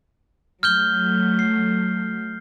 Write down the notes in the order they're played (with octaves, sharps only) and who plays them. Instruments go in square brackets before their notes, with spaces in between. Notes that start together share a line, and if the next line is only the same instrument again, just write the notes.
[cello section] F#3 A3 [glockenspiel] F6 G6 G7
[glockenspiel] C7